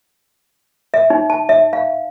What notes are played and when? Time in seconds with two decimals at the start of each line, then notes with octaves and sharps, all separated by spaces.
0.94 E5
1.10 D#4
1.30 A5
1.49 E5
1.73 F5